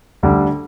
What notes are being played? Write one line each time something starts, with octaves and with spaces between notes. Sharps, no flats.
D2 D3 G3 D4